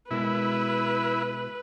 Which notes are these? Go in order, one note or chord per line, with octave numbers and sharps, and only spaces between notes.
B2 G#3 E4 A#4 B4